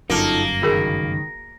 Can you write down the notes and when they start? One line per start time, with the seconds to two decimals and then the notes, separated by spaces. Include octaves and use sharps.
0.10 G1 F#2 A#3 D#4 F4 A4
0.62 C#2 D#3 F#4 G#4 A#4 B5